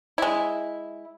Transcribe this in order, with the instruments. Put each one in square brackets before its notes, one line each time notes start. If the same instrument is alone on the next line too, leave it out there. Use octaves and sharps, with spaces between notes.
[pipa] G#3 E4